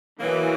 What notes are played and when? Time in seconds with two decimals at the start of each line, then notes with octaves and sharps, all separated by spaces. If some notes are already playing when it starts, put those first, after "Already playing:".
0.19 B2 E3 F#3 A#3